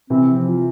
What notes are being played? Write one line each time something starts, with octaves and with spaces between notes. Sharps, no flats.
C3 E3 C4
F3
F4